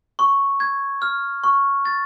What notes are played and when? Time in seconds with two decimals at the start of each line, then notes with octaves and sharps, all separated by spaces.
0.19 C#6
0.60 G#6
1.02 F6
1.44 C#6
1.85 A6